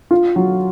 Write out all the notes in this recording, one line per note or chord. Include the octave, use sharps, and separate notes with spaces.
F4
F#3